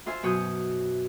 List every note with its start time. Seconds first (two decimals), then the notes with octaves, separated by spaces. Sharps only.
0.06 F4 C5 E5 G#5 C6
0.23 F#2 B2 C#5 C#6 D#6 G6